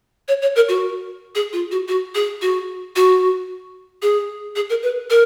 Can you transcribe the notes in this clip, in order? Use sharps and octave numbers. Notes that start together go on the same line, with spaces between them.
C#5
C#5
A#4
F#4
G#4
F4
F#4
F#4
G#4
F#4
F#4
G#4
G#4
A#4
B4
A#4